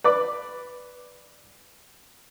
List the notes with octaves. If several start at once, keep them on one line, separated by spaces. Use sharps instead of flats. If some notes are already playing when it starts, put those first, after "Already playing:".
B4 D5 D6